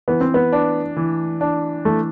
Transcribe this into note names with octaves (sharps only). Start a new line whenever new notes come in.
E3 B3
C4
B3
D4
E3
D4
E3 A3